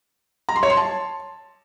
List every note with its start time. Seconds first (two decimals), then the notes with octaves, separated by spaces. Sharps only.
0.49 A#5
0.56 C6
0.63 C#5
0.70 C6
0.77 A5